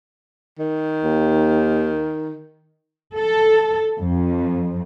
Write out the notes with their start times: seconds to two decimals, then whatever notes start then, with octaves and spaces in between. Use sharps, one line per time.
0.59 D#3
1.04 D#2
3.16 A4
3.98 F2